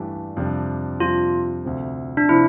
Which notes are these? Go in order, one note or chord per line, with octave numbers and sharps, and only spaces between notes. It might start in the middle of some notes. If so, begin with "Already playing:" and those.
Already playing: G2 E3 A3 D4 G4
F2 C3 G3 D4
F2 C3 G3 D4 F4
D2 C3 F3 C4
D4
C3 F3 C4 E4